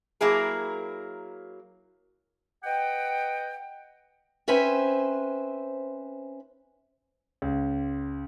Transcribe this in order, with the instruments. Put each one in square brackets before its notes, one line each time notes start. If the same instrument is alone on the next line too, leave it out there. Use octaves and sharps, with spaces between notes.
[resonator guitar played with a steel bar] F#3 A#3 E4 G#4 A#4
[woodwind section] B4 D#5 F#5 G5
[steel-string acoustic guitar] C4 C#4 B4 C5 E5 G#5
[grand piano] C#2